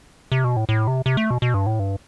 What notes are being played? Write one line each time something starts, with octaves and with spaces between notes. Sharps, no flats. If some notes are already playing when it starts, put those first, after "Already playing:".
C3
B2
A2
A2
C3
C3
A3
B2
B2
G2
A2
G2